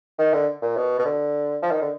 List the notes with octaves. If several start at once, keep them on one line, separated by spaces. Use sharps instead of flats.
D#3
D3
A#2
B2
B2
D3
F3
D#3
D3